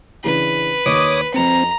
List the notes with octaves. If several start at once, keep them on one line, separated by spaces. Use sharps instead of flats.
C#3 E3 D4 B4
D#2 C#5 D#5 D6 D#6
F2 C4 A#5 B5 C#7